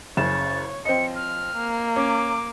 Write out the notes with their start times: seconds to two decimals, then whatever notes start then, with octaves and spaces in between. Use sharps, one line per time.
0.17 F#1 C#3 C#5 A6 E7
0.85 F3 C4 D#5 C#7
1.16 F6
1.55 A#3
1.96 C#4 D6